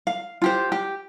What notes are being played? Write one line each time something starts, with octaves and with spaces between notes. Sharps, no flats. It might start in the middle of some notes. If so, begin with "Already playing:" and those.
F5
F4 G4 C5
G4